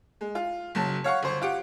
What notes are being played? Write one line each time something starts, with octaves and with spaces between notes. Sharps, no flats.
G#3
F4
F#1 F#3 A5
C#5 F5 F#5 C#6
G1 C5 C#6
F4 G4 F#5